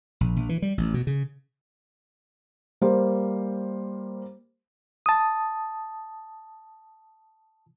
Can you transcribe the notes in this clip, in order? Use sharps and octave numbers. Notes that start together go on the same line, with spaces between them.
A#1
A#1
E3
G3
A1
B2
C#3
G3 A#3 A#4 C5
A5 D#6